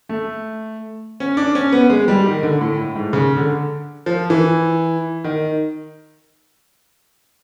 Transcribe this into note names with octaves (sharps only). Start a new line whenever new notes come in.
A3
C#4
D4
C#4
B3
G#3
G3
D#3
D3
A2
A2
G#2
C#3
D3
F3
E3
D#3